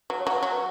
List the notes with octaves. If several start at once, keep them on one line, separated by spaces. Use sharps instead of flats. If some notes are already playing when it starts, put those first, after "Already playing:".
F#3 B4
C#5
F#3 B4
F#3 C#5
B4